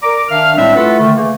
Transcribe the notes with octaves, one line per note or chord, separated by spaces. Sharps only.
A#4 D5 A#5 D6
D#3 D4 E5 F5 F6
A2 G3 G#3 C4 D4 E5
A3 E4 F4 A4 B4 F#5
D3 D#3 A3
C#3 E3 A3 A#3